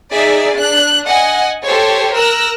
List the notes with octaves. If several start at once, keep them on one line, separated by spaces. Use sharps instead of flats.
D#4 G#4 D5 E5
D4 F#6
D#5 F#5 G#5
G4 A4 C5 C#5
A#4 E6 F#6 A#6